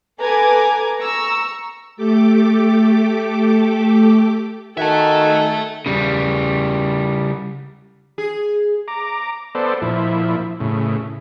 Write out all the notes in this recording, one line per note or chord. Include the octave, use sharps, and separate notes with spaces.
A4 B4 G#5 A#5 D6 G#6
A#5 C#6 E6
A3 G4 A4 D6
D#3 F#4 A4 E5 G#5 A5
C#3 G3
G#4
A#5 D6
B3 A4 C5 D5
A#2 F3 E4
A2 C#3